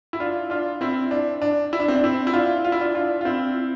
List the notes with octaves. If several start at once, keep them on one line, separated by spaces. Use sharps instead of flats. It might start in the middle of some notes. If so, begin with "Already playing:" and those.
E4
D4 F4
D4 F4
C4 E4
D4
D4
E4
D4
C4
D4
C4 E4
E4
D4 F4
F4
E4
D4 F4
D4 F4
F4
C4 E4